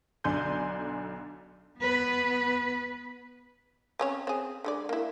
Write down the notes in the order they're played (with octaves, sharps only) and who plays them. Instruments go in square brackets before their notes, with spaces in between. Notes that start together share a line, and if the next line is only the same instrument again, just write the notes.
[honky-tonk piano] B1 D3 D5 G#5 C6 G6
[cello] B3 B4
[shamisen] C4 C#4 C#5
C4 G#4
D3 G#3 D5
A#3 E4